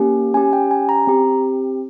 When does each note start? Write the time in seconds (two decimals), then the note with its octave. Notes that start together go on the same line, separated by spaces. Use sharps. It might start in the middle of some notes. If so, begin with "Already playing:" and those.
Already playing: A#3 C#4 G4
0.34 C#4 G4 G#5
0.53 G5
0.71 G#5
0.89 A#5
1.07 C4 G4